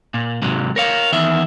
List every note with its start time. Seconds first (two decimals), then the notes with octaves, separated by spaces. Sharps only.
0.14 A#2
0.42 G#2 C3 F#3
0.76 A#4 C#5 F5
1.13 E2 D#3 E5